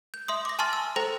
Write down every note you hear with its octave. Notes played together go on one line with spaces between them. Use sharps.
G6
E5 C6 D#6
D6 A#6
G#5 A5 C6 C#6 F6 A6
E6
A4 C5 G5 A#5 A#6